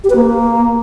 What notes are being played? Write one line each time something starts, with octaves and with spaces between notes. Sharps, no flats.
G4
B4
A#3